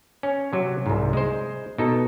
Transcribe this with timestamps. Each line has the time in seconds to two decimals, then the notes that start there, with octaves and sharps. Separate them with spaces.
0.23 C#4
0.53 C3 F#3
0.86 C2 G#2
1.13 G#3 C5
1.78 B2 D#4 A4